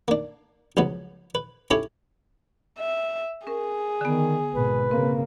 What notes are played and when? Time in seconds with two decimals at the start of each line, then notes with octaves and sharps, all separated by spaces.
0.08 A#3 D4
0.77 C#2 F3 F#3 B3
1.35 B4
1.71 C#4 E4 G4 A4 C#5
2.79 E5
3.47 C#4 G#4 A#4
4.01 D3 D#3 B3
4.55 G#1 B2 B4
4.91 C#3 A#3 C4